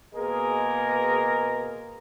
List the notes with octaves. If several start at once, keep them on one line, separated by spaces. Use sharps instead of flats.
B2 G#3 A#3 G#4 A#4